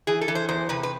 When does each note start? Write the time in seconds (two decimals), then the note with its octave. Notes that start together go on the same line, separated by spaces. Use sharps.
0.07 E3 G#4
0.21 A4
0.28 E3
0.35 C5
0.49 E2 C5
0.69 C3 B4
0.83 B4